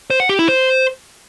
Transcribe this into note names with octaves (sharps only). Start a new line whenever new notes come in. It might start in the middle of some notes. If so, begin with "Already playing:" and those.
C5
F#5
G4
E4
C5